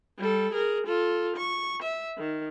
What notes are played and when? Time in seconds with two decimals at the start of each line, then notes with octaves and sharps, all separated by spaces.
0.18 G3 A4
0.53 G#4 A#4
0.87 F4 A4
1.37 C#6
1.83 E5
2.18 D#3